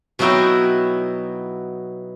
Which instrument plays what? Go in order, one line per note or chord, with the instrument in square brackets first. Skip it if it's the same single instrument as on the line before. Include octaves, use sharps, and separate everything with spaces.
[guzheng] B2 F#3 D#4 E4 F#4 G5